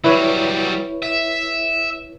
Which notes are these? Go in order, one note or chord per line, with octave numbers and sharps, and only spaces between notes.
F#3 G3 E4 B4 C#5
E5